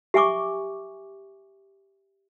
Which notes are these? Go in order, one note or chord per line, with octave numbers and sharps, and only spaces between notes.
G4 E5 G#5 C#6 D6